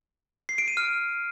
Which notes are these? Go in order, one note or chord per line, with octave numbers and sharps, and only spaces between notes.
C7
D7
D#7
F6